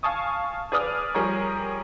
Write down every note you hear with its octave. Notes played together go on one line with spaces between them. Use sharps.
F5 G#5 A5 C#6 D#6
G#4 B4 D5 D#6 F6
F3 G3 G#4 A#4 C#5